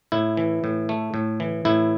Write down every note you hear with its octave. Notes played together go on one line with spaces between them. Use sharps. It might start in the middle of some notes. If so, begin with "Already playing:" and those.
A2 E4
E3
A2
A3
A2
E3
A2 E4